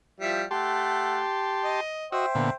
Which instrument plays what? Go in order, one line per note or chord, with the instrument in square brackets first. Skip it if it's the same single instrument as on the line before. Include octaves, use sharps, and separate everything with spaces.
[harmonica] F3 G3 E4
[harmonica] A3 F#5 [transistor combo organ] G4 A5 C6
[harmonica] D#5
[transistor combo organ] F#4 D#5 E6 [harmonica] C5 E5 G5
[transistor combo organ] A#2 D3 B3